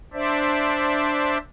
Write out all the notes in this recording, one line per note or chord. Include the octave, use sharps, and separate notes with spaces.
D4 C5 D5 E5